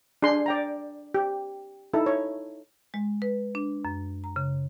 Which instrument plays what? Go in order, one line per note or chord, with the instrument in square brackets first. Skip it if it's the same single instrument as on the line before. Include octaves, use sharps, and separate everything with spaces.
[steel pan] D4 G#4 C6
D5 G5 A#5
G4
D#4 E4 A4
C#5
[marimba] G#3
B4
D4
F#2
A#5
C#3